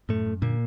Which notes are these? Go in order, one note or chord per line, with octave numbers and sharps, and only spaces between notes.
F#2 A2 A3
F#2
A#2 D3 A#3